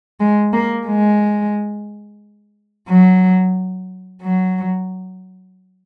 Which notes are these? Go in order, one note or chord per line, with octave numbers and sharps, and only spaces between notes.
G#3
A#3
G#3
F#3
F#3